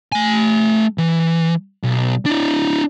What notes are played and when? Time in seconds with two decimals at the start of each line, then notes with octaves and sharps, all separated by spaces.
0.12 A3 G#5
0.98 E3
1.83 B1
2.26 D4 E4